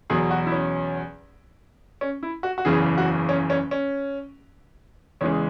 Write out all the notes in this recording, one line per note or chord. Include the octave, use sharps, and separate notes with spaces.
E2 B2 F#3 G#4
F#4
E4
C#4
C#4
E4
F#4
F#4
F#1 E2 C#3 E3 G#4
F#4
C#4
C#4
C#4
E2 C#3 E3 G#3 C#4